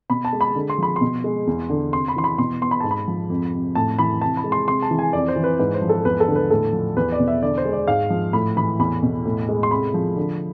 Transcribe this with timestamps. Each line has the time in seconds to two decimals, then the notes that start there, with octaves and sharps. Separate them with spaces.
0.10 B2 B5
0.25 A5
0.33 G#3
0.41 B5
0.56 D3
0.70 C6
0.78 F3 B5
0.96 B2 C6
1.24 G#3
1.47 E2
1.70 D3
1.93 C3 C6
2.08 B5
2.16 E3 C6
2.24 B5
2.38 B2 C6
2.62 B3 C6
2.71 B5
2.80 G#2 A5
2.91 B5
3.08 F3
3.30 F2
3.53 C3
3.75 A2 A5
3.99 E3 B5
4.22 C3 A5
4.37 B5
4.44 G#3
4.52 C6
4.68 C3 C6
4.82 A5
4.91 E3
4.99 G#5
5.13 F2 D5
5.28 C5
5.36 E3
5.44 B4
5.59 G#2 B4
5.74 C5
5.82 F3
5.89 A4
6.05 E2 B4
6.20 A4
6.28 D3
6.36 B4
6.51 A2 A4
6.73 F3
6.96 E2 B4
7.12 D5
7.20 B2
7.28 E5
7.42 D3 D5
7.58 C5
7.65 G#3
7.73 D5
7.88 G#2 F5
8.10 F3
8.33 A2 B5
8.56 E3 B5
8.79 E2 B5
9.03 B2
9.25 A2
9.49 G#3
9.63 C6
9.71 C3 B5
9.94 F3
10.17 D3